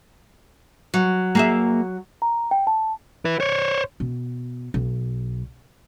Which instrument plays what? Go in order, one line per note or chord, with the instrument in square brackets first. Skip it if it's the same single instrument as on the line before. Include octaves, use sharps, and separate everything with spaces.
[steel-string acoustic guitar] F#3
[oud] A#3 G#4 E5
[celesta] A#5
G5
A5
[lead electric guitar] E4 B4
C5 C#5
[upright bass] B2
B1